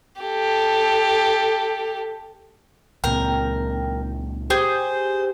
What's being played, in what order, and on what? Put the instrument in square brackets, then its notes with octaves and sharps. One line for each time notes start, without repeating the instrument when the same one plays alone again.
[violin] G4 A4
[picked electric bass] C#2 A#2 C4 [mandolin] A#4 [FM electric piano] G5
[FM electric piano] G4 G6 [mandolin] G#4 [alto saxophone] C5